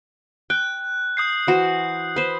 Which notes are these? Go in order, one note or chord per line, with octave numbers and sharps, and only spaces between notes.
G5 F#6
D#6 G6 C7
E3 F#4 C5
B4 C5